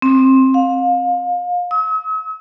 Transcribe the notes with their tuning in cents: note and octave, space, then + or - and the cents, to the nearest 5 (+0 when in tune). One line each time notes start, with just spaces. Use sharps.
C4 +15
F5 +30
E6 -45